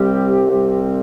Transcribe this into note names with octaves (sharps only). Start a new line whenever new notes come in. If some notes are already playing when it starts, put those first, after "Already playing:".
Already playing: C2 C3 G3 C4 G4
C2 C3 G3 C4